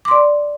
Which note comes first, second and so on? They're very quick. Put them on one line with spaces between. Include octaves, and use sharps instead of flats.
D6 C6 D5